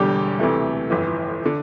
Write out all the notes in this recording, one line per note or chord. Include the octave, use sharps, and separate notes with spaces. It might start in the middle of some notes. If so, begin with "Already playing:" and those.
Already playing: E1 E2 D3 G3 G4
D2 C3 E3 A3
G1 F2 E3
D3